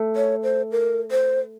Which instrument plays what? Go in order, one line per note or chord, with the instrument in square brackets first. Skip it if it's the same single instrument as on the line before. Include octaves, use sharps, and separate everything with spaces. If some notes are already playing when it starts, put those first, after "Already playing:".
Already playing: [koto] A3
[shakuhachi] C#5
C5
A#4
C5